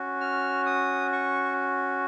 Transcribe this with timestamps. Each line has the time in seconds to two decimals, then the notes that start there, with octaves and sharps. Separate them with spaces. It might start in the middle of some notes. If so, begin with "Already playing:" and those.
Already playing: C#4 F#4
0.21 F6
0.66 D#6
1.12 C#6